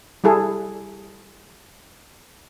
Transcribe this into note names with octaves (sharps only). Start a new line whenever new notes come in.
G3 E4 G#4 A4